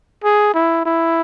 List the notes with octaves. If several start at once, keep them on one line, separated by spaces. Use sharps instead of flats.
G#4
E4
E4